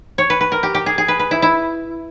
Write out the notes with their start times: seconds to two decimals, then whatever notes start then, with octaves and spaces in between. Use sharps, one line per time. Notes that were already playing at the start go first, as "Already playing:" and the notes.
0.18 C#5
0.30 B4
0.41 B4
0.52 A#4
0.63 G4
0.75 G4
0.86 G#4
0.98 G#4
1.08 B4
1.19 B4
1.31 E4
1.42 E4